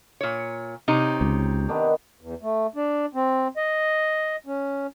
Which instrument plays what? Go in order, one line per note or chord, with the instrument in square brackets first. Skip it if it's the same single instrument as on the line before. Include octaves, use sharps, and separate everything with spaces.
[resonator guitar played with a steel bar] A#2 C#5
[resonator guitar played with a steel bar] C3 D#4 [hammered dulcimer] C#5
[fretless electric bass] C#2
[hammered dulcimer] D#3 B3 D4
[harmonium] E2
A3
D4
C4
D#5
C#4